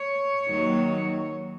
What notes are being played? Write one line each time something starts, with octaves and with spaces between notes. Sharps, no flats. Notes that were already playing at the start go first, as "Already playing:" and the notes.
Already playing: C#5
D#2 D#3 F#3